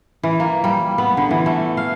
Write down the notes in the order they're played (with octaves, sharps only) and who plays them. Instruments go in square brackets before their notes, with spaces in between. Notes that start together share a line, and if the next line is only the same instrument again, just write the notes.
[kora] E3
A#3
G3
B3
D3
E3
A3
F5